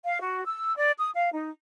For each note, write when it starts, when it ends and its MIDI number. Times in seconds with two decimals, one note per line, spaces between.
0.05 0.19 77
0.21 0.42 66
0.45 0.74 88
0.76 0.91 74
0.99 1.10 87
1.15 1.29 77
1.33 1.50 63